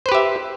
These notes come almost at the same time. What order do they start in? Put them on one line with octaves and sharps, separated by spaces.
C5 B4 G4 E5